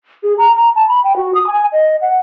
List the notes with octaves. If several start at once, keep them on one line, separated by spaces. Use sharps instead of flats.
G#4
A#5
A#5
A5
B5
G5
F#4
D#6
G#5
D#5
F#5